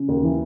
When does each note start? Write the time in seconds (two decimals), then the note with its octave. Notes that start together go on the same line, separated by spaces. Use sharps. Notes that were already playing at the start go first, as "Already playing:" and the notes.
Already playing: C#3
0.08 D#2
0.23 E3